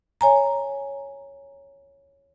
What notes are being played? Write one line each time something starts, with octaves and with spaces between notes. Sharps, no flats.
C#5 G#5 A#5